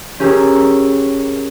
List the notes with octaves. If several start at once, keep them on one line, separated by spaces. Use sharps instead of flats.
C#4 G4 G#4 A#4 E6